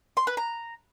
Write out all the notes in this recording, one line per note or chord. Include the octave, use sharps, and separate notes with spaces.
C6
B4
A#5